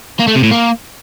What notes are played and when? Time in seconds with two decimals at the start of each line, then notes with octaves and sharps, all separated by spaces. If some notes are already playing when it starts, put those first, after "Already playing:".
0.19 A#3
0.27 A3
0.35 C3
0.43 A2
0.51 A#3